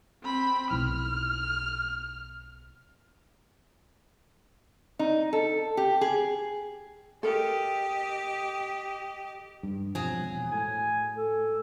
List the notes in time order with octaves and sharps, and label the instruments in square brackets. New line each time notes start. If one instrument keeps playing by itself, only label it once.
[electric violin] C4 B5
[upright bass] B1 E4 [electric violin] F6
[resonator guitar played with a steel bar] D#4
A4
G4
G#4
[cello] G4 D#5 [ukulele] A4 A#4
[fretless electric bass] G2
[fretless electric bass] E1 C3 F3 [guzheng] F#3 G#4
[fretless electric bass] E1
[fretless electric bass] A2 [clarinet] G#5
[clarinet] A4